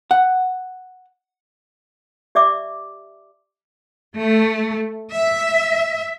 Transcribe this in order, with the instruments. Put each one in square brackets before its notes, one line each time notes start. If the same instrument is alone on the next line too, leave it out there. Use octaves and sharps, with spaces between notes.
[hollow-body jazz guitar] F#5
[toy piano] G4 D5 E5 D6
[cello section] A3
E5